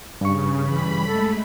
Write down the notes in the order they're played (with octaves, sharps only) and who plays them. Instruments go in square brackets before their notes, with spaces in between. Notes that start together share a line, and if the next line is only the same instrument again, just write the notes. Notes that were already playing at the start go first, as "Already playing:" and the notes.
[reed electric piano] G2 C#6 [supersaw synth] C#3
[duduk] E3 [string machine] G3 [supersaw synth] B5
[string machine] G#3 A3 [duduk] A4